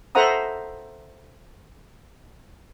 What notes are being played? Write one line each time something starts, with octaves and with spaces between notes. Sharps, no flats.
A4 C5 E5 F#5 A#5 D#6